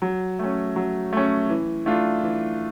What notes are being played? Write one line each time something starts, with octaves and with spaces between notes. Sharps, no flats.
F#3
A3 C#4
F#3
A3 C#4
E3
A3 D4 F4
E3